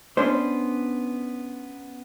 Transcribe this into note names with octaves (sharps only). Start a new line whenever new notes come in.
B3 C#4 D4 C5